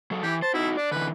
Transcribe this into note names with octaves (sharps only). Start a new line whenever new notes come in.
F#3 A4
E3 G4
C5 A5
D#4 E4 F#4
D4 D5
D3 E3 B4